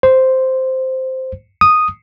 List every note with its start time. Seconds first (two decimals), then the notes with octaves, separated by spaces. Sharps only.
0.03 C5
1.61 D#6